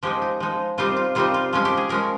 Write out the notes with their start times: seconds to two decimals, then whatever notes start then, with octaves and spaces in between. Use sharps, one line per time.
0.03 F3 G#3 D#4 G4
0.22 D#4
0.40 F3 G#3 D#4
0.78 C3 G3 C4 D#4 F4
0.97 F4
1.15 C3 G3 C4 D#4 F4
1.34 F4
1.53 F3 G#3 C#4 F4
1.65 G4
1.77 G#4
1.89 F3 G#3 C#4 A#4